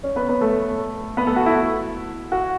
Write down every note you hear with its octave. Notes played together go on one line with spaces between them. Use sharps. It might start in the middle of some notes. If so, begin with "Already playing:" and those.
C#4 C#5
B3 B4
B3 B4
A3 A4
B3 B4
A3 A4
F#4
E4
F#4